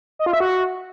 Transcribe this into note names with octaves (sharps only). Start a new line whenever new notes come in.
D#5
F4
E5
F#4